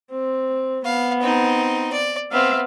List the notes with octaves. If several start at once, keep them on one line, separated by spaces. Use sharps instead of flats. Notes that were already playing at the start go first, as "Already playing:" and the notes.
C4
B3 F5
C4 D#4
D5
B3 C4 E5 F5